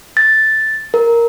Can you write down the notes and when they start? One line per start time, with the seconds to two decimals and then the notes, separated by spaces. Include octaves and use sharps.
0.17 A6
0.94 A#4